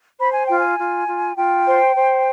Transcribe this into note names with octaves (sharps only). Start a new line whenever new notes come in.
C5 B5
G#5
F4 G5
G#5
F4
F4
F4 G5
C5
C5